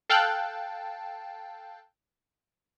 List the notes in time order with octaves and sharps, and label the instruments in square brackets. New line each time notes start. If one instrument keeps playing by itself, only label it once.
[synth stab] A4 F5 G5 A5 E6 F#6